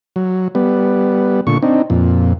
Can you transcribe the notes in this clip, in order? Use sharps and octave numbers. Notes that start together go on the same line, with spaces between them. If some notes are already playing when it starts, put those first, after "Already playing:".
F#3
G3 B3
A#2 D3 C#6
C4 D4 D#4
F2 A#2